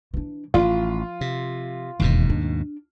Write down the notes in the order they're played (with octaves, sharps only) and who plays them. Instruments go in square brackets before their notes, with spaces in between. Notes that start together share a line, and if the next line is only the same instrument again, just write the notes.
[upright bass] E3 D4
[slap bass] A1 [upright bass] F3 [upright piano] F4
[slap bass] C3
[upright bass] E1 E3 [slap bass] D#2 G#2 B2
[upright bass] D4